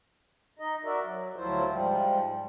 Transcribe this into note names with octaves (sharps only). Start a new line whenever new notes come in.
D#4 D#5
F#4 A#4 D5 E5
F#3
D2 F3 F#3 E4 F4 C5
G#2 F3 G3